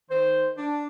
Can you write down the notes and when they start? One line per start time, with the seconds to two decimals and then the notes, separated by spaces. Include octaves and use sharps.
0.11 D#3 C5
0.58 D4